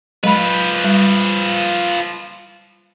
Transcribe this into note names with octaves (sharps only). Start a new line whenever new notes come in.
F3 F#3 G#3 B4 B5
G3